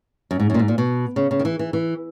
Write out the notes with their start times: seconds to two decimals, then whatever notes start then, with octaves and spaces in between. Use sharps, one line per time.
0.31 F#2
0.40 G#2
0.50 F#2
0.54 A#2
0.59 G#2
0.68 A#2
0.78 B2
1.16 C#3
1.31 C#3
1.39 D#3
1.45 E3
1.59 E3
1.73 E3